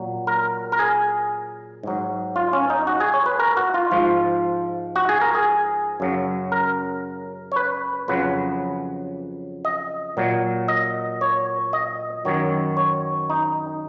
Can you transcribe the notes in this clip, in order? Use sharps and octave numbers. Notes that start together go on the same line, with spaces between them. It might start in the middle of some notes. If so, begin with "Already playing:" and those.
Already playing: A#2 F#3
A#4
A#4
G#4
G#2 F#3
F4
C#4
D#4
F#4
G#4
C#5
B4
A#4
F#4
F4
G#2 F3 F4
F#4
G#4
A#4
G#4
F#2 C#3 F#3
A#4
C#5
B4
F2 C#3 F#3 B4
D#5
A#2 F#3
D#5
C#5
D#5
F#2 D#3 F#3 C#5
C#5
D#4